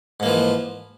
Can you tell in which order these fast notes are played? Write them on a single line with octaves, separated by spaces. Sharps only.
G#2 A#3 E3 F3